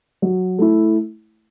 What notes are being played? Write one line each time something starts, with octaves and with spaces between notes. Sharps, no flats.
F#3
A3 E4